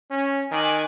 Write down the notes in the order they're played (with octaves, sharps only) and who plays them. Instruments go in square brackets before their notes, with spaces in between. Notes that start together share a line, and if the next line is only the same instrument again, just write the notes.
[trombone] C#4
[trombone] D#3 [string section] G#5 D6 F#6